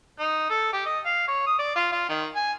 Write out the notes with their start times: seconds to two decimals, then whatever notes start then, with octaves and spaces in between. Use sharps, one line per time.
0.19 D#4
0.50 A4
0.73 G4
0.86 D#5
1.05 F5
1.28 C#5
1.47 D#6
1.59 D5
1.76 F4
1.92 F4
2.09 D#3
2.36 G#5